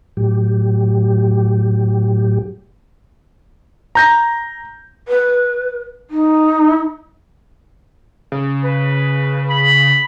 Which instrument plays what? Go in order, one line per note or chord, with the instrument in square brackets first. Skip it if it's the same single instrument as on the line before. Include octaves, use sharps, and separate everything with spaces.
[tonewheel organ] A2 F#3 G4
[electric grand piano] A#5 G6 A#6
[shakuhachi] B4
D#4
[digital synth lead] C#3
[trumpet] B4
B5